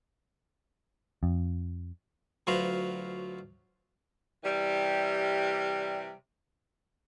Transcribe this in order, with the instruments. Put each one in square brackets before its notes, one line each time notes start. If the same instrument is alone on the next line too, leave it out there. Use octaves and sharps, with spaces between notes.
[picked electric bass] F2
[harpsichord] D2 F#3 F4 B4 C5 A#5
[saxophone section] C3 E3 G3